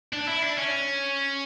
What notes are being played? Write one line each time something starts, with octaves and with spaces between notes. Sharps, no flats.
D4
E4
D4
C#4